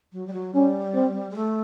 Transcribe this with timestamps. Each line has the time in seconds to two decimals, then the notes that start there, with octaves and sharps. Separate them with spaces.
0.13 F#3
0.27 G3
0.33 F#3
0.54 G3 C#4
0.94 C4
1.31 G#3
1.36 A3